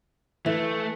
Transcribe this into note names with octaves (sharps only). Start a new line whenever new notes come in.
E3 A3